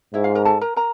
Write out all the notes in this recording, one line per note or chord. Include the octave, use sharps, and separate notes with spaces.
G#2 E4 E5
F4 F5
A#4 A#5
A4 A5
A#4 A#5
A#4 A#5